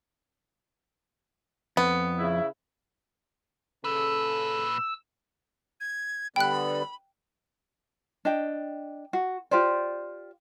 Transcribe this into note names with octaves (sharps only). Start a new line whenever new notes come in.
F2 B3
C#3 E4
A#2 C#3 A4 B4 E6
G#6
D3 G3 B3 G5 B5 F#6
D4 D#5 G5
F#4
F4 G4 C5 D5